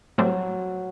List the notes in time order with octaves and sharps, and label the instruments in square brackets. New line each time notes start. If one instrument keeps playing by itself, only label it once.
[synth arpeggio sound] A2 G3 C4 [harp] F#3